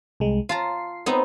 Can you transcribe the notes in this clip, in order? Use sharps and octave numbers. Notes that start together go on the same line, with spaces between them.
C2 G#3
F4 A5 A#5 C7
B3 C4 D#4